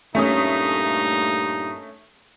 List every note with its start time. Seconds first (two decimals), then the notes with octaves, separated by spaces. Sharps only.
0.15 G2 A#2 A3 C#4 D#4 D#6